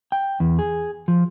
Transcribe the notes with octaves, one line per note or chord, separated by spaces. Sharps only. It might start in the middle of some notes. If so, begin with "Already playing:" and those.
G5
E2
G#4
F3